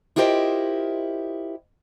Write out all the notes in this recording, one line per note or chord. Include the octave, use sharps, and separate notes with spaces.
E4 F4 G4 A#4 C5 D#5